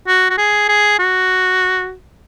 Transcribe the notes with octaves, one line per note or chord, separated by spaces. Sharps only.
F#4
F#4
G#4
G#4
F#4